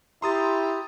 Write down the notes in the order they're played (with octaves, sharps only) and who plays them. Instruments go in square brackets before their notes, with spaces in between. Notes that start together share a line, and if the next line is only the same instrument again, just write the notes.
[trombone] E4 [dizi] G4 [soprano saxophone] A#5 [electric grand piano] C6 D#6 A6